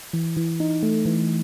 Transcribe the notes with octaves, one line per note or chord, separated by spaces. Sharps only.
E3
E3
D#4
A3
E3